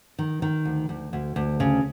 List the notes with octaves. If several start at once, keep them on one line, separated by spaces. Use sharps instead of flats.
D#3
D#3
D2
D2
D2
D2
C#3